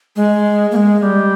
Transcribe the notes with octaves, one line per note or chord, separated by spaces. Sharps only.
G#3
A#3
G#3
G#3
G3